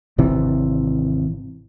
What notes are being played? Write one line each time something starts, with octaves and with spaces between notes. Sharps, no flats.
G#1 C3 E3